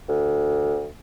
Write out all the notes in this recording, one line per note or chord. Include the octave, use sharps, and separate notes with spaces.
D2